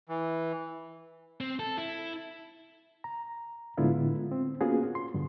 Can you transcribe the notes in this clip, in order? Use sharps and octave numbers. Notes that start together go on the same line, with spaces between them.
E3
C4
A4
E4
A#5
A2 D3 G#3 B3 E4 F4
C4
A#3 B3 C#4 F4 F#4 G#4
C6
G2 D3